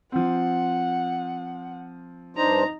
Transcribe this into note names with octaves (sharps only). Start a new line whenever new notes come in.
F3 C4 F#5
G2 D4 D#4 C5 A#5